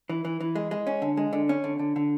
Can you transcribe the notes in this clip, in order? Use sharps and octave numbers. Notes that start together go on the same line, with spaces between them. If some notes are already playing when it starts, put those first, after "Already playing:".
E3
E3
E3
G#3
G#3
C#4
D3
G#3
D3
C#4
D3
D3
D3